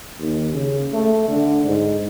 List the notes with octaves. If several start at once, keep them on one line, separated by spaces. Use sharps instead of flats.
D#2
C#3
A3
D3
G#2